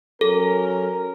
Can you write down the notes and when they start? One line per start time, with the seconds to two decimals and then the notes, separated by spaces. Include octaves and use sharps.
0.21 F#3 C#4 A4 A#4